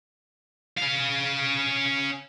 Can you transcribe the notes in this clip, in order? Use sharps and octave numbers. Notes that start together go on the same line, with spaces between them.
C#4 F5